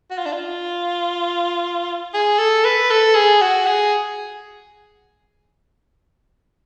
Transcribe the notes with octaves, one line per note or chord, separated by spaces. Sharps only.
F#4
F4
D4
F4
G#4
A4
B4
A4
G#4
F#4
G#4